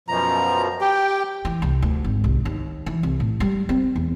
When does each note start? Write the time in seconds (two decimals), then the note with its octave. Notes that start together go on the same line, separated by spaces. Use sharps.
0.08 F#2 B2 F3 A#5
0.81 G4 G5
1.45 E3
1.62 C2
1.82 D2
2.04 G#1
2.24 C2
2.45 D#2
2.86 E3
3.03 C2
3.20 A2
3.40 G3
3.69 C4
3.96 E2